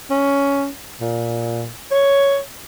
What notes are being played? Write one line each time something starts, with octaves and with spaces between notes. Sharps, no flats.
C#4
A#2
C#5